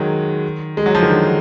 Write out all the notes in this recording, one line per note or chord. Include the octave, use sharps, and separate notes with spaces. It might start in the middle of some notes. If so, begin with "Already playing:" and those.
Already playing: D#3 F#3 G#3
G#3
F#3
F3
D#3
D3